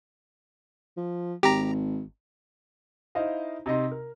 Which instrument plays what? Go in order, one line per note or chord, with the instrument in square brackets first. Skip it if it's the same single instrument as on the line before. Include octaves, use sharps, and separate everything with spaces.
[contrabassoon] F3
[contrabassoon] G#1 [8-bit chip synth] G4 A#5
[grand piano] D#4 E4 C5 D#5 F5
C3 D#4 D#5 C6
A#4